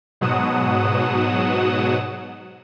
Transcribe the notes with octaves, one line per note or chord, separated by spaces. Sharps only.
G#2 B2 F#3 F#5 D#6 E7